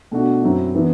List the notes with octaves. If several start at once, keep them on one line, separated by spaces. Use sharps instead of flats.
B2 A3 D4 F#4
F#2 F#3 C4 E4
E3 B3 D4